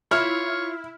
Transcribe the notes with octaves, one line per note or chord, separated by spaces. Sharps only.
E4 F4 C#5 F6